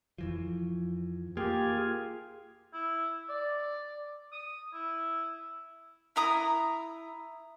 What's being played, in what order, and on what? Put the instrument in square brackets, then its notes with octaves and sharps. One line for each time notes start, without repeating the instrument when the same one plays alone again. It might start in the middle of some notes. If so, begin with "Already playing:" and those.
[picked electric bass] F2 E3 F3
[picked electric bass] A#3 [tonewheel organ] F4 G#4 [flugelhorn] G4
[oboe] E4
D5
D#6
E4
[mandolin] E4 A#5 D#6